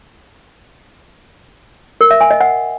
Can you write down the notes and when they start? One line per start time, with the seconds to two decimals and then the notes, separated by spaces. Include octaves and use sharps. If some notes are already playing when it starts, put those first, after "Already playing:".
2.01 A#4
2.11 E5
2.21 G#5
2.31 D#5
2.41 F#5